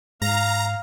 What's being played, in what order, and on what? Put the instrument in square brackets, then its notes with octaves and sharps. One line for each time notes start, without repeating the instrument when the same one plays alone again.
[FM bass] G#2 [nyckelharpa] F5 [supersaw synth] A#5